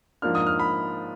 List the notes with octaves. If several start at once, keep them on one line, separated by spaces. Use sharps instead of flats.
G#2 F3 A#3 D4 F6
D#6
F6
B5